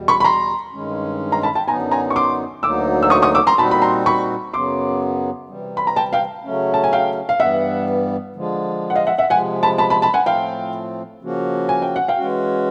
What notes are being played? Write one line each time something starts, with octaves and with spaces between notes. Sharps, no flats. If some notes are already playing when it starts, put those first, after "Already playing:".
Already playing: E2 B2 G3
B5 C#6
B5
A#5 C6
G2 D#3 G#3 C#4
A#5 C6
A5 B5
G5 A5
F#2 D3 F#3 B3 D#4 G#5 A#5
G#5 A#5
C#6
C6 D6
D2 D3 F#3 A#3 D#4 D6 E6
E6
C#6 D#6
C#6 D#6
D6 E6
A#5 C6
A#2 G3 C4 D#4 F#4 A5 B5
B5
A#5 C6
B5 C#6
F#2 C#3 F#3 B3 C6 D6
C3 E3 G3
B5
A#5
G5 A5
F5 G5
C#3 F#3 A3 C#4
A5
G#5
F5 G5
F5
G2 E3 G3 B3 E5 F#5
D3 F3 G#3
F#5
D#5 F5
E5 F#5
E5 F#5
C3 F3 G#3 F#5 G#5
A5 B5
A5 B5
A5 B5
A5 B5
F#5 G#5
A2 F3 A3 C4 F4 F5 G5
C#3 F3 A#3 C#4 F#4
G#5
G5
F#5
F5 G5
E3 G#3 C#4 F#4